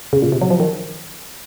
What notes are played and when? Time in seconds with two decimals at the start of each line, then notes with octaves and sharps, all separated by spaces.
0.13 C#3
0.22 A#2
0.32 C3
0.42 F#3
0.50 F3
0.60 D#3